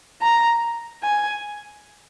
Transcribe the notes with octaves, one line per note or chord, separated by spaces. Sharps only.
A#5
G#5